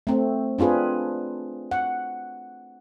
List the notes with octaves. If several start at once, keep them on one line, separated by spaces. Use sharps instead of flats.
A3 C4
C4 D4 F4 G#4 B4
F#5